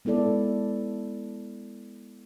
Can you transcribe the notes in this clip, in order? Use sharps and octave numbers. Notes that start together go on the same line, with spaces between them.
G#3 B3 E4 A4 D5